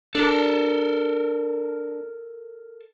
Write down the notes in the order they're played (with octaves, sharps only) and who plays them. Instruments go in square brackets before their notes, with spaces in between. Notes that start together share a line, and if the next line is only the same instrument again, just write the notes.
[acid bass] D4 [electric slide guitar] A4 A#4